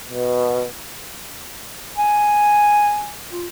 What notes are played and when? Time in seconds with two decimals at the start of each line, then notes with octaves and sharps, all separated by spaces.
0.10 B2
1.97 G#5
3.31 F4